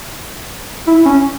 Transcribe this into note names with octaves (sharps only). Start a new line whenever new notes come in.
E4
C#4